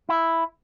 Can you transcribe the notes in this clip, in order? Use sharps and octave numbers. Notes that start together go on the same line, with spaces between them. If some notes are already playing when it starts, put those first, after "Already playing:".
E4